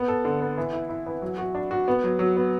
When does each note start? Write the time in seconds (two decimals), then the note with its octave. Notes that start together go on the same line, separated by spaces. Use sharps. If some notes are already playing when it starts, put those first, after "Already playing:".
Already playing: B3
0.08 A4
0.25 D3
0.40 B3
0.58 E3
0.73 E4
0.89 E4
1.06 E3
1.22 F#3
1.38 F#4
1.55 D4
1.71 F#4
1.88 B3
2.04 F#3
2.19 F#3
2.36 B3